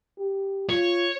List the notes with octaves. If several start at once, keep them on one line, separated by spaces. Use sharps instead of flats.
G4
F4 C#5